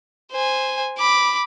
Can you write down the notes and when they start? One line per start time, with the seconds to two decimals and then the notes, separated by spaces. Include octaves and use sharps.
0.32 C5 G#5
0.98 B5 D6